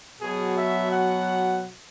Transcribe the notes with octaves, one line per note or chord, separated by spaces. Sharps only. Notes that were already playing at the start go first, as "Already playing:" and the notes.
B2 F#3 G#4
E5
F#5